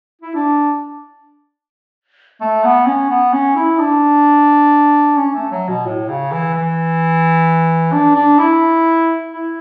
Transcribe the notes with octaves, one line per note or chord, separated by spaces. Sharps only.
E4
D4
A3
B3
C#4
B3
C#4
E4
D4
C#4
A3
F#3
B2
A2
C#3
E3
E3
D4
D4
E4
E4